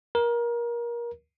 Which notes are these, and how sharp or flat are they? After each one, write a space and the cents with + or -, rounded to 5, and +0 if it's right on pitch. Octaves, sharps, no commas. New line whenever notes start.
A#4 +25